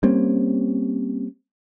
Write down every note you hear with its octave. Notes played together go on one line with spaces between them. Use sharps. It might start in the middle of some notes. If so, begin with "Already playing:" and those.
G3 A#3 C4 C#4